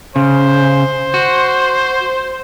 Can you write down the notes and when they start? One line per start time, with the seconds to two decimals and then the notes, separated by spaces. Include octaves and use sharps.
0.16 C#3 C5
1.14 F#4